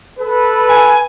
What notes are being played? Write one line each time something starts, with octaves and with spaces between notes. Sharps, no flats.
A4 B4
G#5